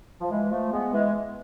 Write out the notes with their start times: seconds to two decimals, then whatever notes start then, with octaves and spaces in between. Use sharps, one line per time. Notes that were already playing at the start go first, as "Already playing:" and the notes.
0.21 F3
0.30 E3 G#3
0.51 F3 A3
0.72 G#3 B3
0.92 E3 G#3